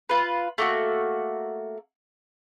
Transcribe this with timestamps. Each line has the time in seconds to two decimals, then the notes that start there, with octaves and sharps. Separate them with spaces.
0.09 F4 B4
0.58 A3 A#3 F#4